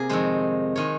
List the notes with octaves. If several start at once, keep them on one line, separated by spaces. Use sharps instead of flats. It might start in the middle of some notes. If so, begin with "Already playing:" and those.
Already playing: C3 A#3 G#4 A#4
F2 D#3 G#3 C5
D#3 G#3 C#5